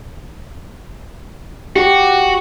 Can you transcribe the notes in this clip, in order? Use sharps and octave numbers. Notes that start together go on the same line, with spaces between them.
F#4 G4